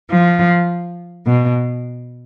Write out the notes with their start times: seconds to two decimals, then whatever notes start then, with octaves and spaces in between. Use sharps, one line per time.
0.10 F3
1.25 B2